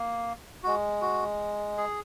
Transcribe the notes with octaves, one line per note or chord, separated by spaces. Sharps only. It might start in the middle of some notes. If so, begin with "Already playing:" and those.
Already playing: A#3
G#3 F#4
F#4
G#4